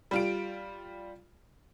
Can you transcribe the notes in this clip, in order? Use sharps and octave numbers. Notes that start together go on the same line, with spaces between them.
G3 F4 D7